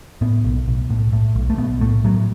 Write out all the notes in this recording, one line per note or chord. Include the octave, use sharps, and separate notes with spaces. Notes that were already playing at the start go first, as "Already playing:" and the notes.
A2 B3
B1
B1
A2
A2
B1
A3
B1 B3
A2 A3
A2 F#3